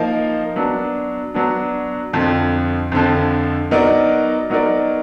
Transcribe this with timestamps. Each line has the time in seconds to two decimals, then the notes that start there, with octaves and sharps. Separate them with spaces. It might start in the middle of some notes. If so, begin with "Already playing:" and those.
Already playing: F3 A#3 D#4 A#4 F5
0.56 F#3 B3 D4
1.34 F#3 B3 D4
2.13 F2 D3 F3
2.92 F2 D3 F3
3.71 F#3 B3 D#4 A#4 D5
4.50 F#3 B3 D#4 A#4 D5